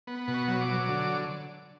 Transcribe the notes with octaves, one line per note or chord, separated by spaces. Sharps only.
B3
B2
C#6
F#3
D6
F#3
D3